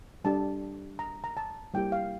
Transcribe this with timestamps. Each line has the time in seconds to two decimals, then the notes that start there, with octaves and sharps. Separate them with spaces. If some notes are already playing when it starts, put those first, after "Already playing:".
0.24 G3 D4 G4 A5
0.99 A#5
1.24 A#5
1.37 A5
1.74 G3 A#3 E4 G4 G5
1.92 F5